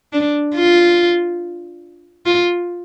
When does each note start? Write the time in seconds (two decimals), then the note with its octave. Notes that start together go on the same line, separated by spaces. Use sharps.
0.13 D4
0.56 F4
2.26 F4